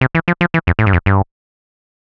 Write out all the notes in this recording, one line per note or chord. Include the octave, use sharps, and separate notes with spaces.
C3
E3
F3
F3
E3
F2
A2
G2
F2
G2